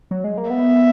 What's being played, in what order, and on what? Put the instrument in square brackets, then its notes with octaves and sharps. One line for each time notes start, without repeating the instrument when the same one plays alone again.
[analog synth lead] F#3
G#3
A#3
[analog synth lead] B3 [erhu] E5